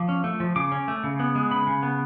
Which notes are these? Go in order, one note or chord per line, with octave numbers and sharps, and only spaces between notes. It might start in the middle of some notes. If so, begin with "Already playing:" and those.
Already playing: F3 D6
C#4
A3
F3
C#3 D6
C#4
A3
C#3
B3
G#3
C#3 B5
C#3
B3